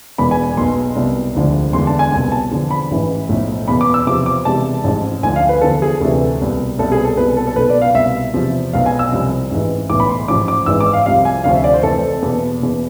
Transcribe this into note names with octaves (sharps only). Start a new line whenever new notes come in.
E1 E2 B2 B5
G#5
G#5
B1 B2 C6
C2 B2
E1 D2 D3 F3
E1 E2 D3 C6
A5
G#5
C2 B2 G#5
A5
E2 D3 F3
B5
A1 G#2 E3
B1 A2 F3
E2 B2 B5
D6
E6
E2 C3 F3 D6
D6
E1 E2 C3 A5
A1 G#2 F3
D2 D3 F3 G#5
F5
B4
E2 D3 F3 A4
G#4
D2 C3 E3 A4
C2 B2
C2 B2 A4
G#4
A4
C2 B2 B4
A4
A4
B1 B2 B4
D5
F5
C2 B2 E5
E2 C3 F3
B1 B2 F5
G#5
E6
C2 C3 F3
A1 G#2 E3
B1 A2 E3 D6
B5
C6
A1 G#2 F3 D6
D6
G#1 G#2 E3 E6
D6
F5
C2 C3 F3 F5
G#5
D2 C3 F3 F5
E5
D5
C5
F1 F2 E3 A4
E2 B2
E2 B2